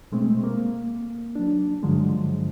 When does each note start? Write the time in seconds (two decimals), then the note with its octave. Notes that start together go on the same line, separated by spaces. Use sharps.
0.12 B2 G#3 A3 C4
0.44 A#3
1.35 F#3 D4
1.83 G2 D3 F3 F#3 G#3